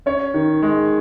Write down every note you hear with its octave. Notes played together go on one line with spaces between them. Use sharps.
C#4 C#5
D#3
G#3